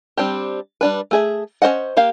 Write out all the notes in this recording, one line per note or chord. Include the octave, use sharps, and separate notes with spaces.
G3 C4 D4 G4
G3 D4 B4
A3 G#4 E5
C#4 F#4 C5 D#5 F#5
A#3 G4 F5